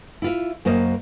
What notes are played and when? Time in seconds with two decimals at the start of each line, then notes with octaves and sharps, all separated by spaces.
0.22 E4 F4 E5
0.65 F#2 A#3 C5 D#5